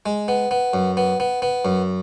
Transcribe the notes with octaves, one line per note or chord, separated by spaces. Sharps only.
G#3
B3
B3
F#2
B3
B3
B3
F#2